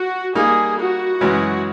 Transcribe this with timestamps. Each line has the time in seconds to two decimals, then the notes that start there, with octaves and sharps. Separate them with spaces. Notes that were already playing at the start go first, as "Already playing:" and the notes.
Already playing: F#4
0.35 G3 A#3 D#4 G#4
0.78 F#4
1.21 F#2 C#3 E3 G#3 C#4 F#4